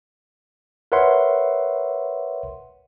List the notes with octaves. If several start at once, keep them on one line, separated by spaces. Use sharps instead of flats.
A#4 B4 C#5 E5 F#5 C6